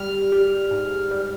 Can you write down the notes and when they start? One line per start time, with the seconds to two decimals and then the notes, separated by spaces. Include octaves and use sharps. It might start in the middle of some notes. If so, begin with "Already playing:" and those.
Already playing: G3 F6
0.32 G3
0.71 G#2
1.11 G3